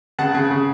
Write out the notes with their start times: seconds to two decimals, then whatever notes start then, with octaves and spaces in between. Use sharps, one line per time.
0.19 C#3 F#5 A5
0.34 C#3
0.51 C#3